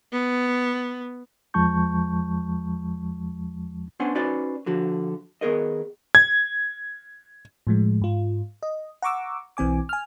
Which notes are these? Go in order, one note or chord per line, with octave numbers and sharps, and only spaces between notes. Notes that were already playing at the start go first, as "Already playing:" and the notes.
B3
E2 F3 G#3 A5 C#6 G6
B3 C#4 D4 C5 F#5 G#5
C#4 D#4 F#4 B4 C5 D5
D3 F3 F#4
D#3 B3 G#4 A#4 D#5
G#6
A2 F3 G#3
G#2 F4
D#5
F#5 A#5 C#6 D6 E6
B1 E3 C4 G#5 D6
G#5 F6